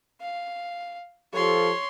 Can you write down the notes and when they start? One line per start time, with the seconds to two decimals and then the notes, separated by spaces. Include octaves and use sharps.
0.21 F5
1.33 F3 G4 A4 C#5 C6